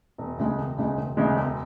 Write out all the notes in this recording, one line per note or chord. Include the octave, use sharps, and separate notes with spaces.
E1
D2 C#3 G#3
E1
D2 C#3 G#3
E1
D2 C#3 G#3
E1